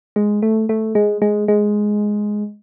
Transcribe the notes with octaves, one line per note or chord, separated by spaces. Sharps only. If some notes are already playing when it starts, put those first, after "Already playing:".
G#3
A3
A3
G#3
G#3
G#3